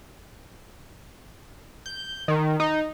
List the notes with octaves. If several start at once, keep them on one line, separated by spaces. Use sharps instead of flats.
G6
D#3
D#4